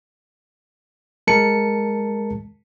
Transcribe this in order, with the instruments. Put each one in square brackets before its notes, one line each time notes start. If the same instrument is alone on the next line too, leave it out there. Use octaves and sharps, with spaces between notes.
[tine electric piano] G#3 A#4 A5 C#7